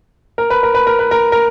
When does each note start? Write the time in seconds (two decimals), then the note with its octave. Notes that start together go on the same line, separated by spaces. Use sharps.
0.38 A#4
0.50 B4
0.63 A#4
0.75 B4
0.87 A#4
0.99 B4
1.11 A#4
1.32 A#4